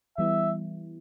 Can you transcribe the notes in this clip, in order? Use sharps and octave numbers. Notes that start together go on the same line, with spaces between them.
E3 G3 B3 E4 E5